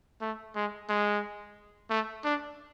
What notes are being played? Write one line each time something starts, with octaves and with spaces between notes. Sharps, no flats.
A3
G#3
G#3
A3
D4